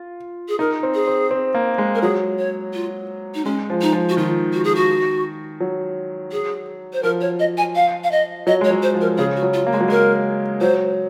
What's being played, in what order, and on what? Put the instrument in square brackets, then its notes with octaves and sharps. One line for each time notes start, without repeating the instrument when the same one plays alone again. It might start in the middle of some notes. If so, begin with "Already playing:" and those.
Already playing: [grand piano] F4
[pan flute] G#4
[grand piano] D#4 [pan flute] A#4
[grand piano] C4
[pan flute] G#4
[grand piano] C4
C4
A#3
G#3
[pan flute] A#4
[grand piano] F#3 [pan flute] G#4
[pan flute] C#5
F4
D#4
[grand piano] G#3 [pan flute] C#4
[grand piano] F3
[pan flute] D#4
[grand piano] F3
[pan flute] F#4
[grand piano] D#3 [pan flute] F4
[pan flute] F#4
G#4
F#4
[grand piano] F#3
[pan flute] G#4
C5
[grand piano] F3 [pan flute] A#4
[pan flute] C#5
D#5
G#5
F5
F5
D#5
[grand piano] F#3 [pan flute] D#5
[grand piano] G#3 [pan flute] C#5
[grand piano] F#3
[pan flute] C5
[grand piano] F3
[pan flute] A#4
[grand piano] C#3 [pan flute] G#4
[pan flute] F#4
[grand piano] F#3
[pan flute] F4
[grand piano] A#3
[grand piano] G#3 [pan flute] F#4
[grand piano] F#3
[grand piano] G#3 [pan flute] A#4
[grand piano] F#3 [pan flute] C5